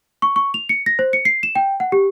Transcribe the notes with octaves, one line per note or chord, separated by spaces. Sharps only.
C#6
C#6
F7
C#7
A#6
C5
C#7
C7
E7
G5
F#5
G4